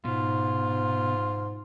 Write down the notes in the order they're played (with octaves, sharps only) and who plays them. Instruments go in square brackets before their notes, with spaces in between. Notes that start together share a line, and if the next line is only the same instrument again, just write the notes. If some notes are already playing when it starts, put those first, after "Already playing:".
[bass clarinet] G#2 [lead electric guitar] B2 [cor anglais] F4